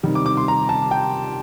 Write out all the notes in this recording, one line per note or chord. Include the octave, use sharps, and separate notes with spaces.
C3 D#3 G3
D6
D6
C6
A#5
A5
G5